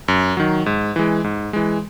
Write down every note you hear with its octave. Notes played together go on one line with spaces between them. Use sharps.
F#2
D#3 F#3
G#2
E3 G#3
G#2
E3 G#3